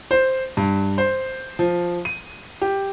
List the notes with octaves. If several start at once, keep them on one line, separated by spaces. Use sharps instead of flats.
C5
G2
C5
F3
D#7
G4